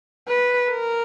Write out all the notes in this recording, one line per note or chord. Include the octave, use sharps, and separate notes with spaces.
B4
A#4